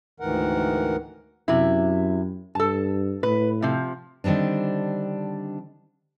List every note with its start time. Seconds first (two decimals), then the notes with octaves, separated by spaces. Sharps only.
0.20 D2 G#2 D#3 E3 A#4 F#5
1.48 F#2 C3 E4
2.55 G2 A4 A5
3.23 A2 B4
3.62 C3 F3
4.24 D3 D#3 G3 C4 D4